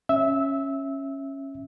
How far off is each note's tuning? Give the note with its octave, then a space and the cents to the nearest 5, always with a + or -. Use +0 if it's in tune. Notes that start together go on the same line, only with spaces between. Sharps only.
C#4 -15 E5 +0 E6 -20